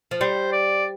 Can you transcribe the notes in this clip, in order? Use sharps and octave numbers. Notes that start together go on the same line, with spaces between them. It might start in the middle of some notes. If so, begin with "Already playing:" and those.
F3
G3 C5
D5